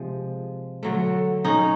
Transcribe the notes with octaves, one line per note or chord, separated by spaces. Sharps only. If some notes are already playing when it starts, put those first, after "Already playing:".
Already playing: C3 F3 G#3
D3 F#3 A3
C#4 D#4